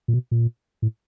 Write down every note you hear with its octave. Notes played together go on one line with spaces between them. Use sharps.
A#2
B2
A#2
A2